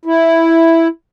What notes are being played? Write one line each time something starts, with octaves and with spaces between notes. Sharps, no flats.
E4